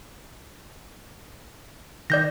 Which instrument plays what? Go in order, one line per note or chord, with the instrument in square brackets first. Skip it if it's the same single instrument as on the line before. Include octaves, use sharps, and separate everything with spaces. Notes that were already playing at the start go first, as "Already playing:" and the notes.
[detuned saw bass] D#3 [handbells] D5 G6 A#6